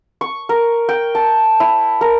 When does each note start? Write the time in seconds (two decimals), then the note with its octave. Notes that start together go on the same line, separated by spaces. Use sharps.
0.21 C#6
0.49 A#4
0.89 G5
1.15 A5
1.60 E4
2.01 A#4